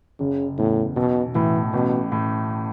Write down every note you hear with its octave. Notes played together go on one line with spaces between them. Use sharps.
F#1 C#3
E2 A2
B1 B2
A2 E3
A1 B2
A2